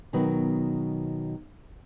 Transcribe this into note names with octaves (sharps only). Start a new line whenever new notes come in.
B2 D#3 F#3 B3